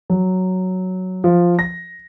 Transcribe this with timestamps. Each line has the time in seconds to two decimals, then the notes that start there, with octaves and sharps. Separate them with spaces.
0.10 F#3
1.24 F3
1.59 A#6